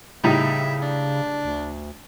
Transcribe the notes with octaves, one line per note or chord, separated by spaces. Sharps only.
A2 C#3 G3 D#4 E5
D4
D2